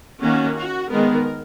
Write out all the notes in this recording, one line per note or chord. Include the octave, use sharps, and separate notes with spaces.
D#3 A#3 C#4 F#4
F#4
D#3 G#3 B3 A#4